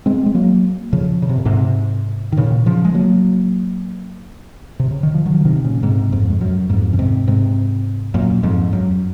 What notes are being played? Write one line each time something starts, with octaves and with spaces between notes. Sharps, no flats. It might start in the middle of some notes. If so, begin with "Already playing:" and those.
G#3 C4
G#3
F#3 A#3
C#3 F3
C#3
C3
A#2
G#2 C3
D#3
A#2 C#3
C#3 F3
G#3
F#3 A#3
C3
C#3
D#3
F3
D#3 F#3
F3
C3 D#3
A#2 C#3
G#2 C3
F2 G#2
G#2
F#2
F2 G#2
C#3
G#2 C3
G#2 C3
F#2 A#2
F2 G#2
F#2